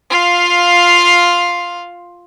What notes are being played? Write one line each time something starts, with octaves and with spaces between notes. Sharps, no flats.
F4 F5